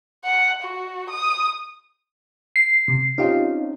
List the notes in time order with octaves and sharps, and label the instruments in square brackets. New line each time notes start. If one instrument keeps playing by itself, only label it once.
[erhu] F#5
F#4
D#6
[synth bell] C7
[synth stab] C3
[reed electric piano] C4 C#4 D#4 [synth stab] F4 G4 F5